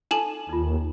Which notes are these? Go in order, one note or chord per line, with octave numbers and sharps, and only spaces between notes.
D#4 A4 G#5 E7 F#7
D#2 D#4 F4